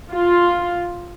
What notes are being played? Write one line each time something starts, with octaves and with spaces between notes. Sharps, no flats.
F4